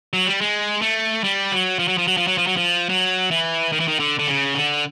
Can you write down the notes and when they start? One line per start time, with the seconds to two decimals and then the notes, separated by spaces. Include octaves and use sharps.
0.13 F#3
0.27 G3
0.41 G#3
0.82 A3
1.24 G3
1.52 F#3
1.79 F3
1.88 F#3
1.98 F3
2.08 F#3
2.17 F3
2.27 F#3
2.38 F3
2.47 F#3
2.57 F3
2.89 F#3
3.31 E3
3.72 D#3
3.80 E3
3.88 D#3
4.00 D3
4.19 D3
4.28 C#3
4.54 D3